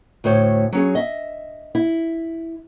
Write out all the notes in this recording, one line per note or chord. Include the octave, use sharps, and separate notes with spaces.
D2 A2 C5 C#5
F#3 C#4 G#4
D#5 E5
E4